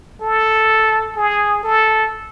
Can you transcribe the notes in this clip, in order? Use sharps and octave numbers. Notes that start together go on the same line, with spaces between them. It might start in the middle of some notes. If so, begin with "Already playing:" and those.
A4
G#4
A4